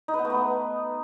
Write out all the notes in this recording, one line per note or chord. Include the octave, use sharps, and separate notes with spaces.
D#4
B4
B3
A3
B3